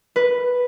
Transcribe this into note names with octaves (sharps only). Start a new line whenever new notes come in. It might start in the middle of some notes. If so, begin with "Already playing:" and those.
B4